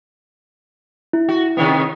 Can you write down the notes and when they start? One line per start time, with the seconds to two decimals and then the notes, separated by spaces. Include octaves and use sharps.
1.13 E4
1.29 F#4
1.57 C3 D#3 B3